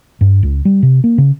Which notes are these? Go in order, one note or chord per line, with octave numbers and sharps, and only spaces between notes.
G2
C#2
G3
C3
A#3
C#3